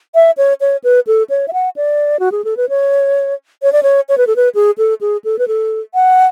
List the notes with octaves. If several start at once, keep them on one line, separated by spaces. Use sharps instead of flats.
E5
C#5
C#5
B4
A4
C#5
E5
F#5
D5
F#4
G#4
A4
B4
C#5
C#5
D5
C#5
C#5
B4
A4
B4
G#4
A4
G#4
A4
B4
A4
F#5